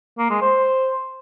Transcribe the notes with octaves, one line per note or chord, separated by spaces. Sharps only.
A#3
G#3
C5